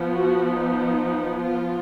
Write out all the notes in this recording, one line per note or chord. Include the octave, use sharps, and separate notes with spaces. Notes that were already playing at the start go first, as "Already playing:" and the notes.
Already playing: F3 B3
F#4
D#4
F4